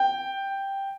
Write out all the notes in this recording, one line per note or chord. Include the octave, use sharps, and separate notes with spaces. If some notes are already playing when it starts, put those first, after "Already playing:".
Already playing: G5